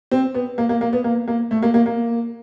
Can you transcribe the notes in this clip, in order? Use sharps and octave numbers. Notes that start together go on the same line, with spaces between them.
C4
B3
A#3
A#3
A#3
B3
A#3
A#3
A3
A#3
A#3
A#3